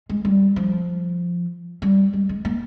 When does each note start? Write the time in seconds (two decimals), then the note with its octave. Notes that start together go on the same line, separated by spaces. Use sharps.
0.09 G#3
0.25 G3
0.56 F3
1.82 G3
2.13 G#3
2.29 G#3
2.45 A#3